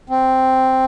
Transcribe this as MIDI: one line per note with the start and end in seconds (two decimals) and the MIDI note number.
0.10 0.85 60